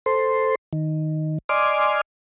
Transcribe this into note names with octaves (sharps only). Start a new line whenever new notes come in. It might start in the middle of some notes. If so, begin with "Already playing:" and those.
A4 C5 C6
D#3
D5 D#5 G#5 C6 D6 F6